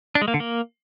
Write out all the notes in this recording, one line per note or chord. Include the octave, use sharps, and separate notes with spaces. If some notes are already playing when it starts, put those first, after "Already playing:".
D4
G#3
A#3
D3
A#3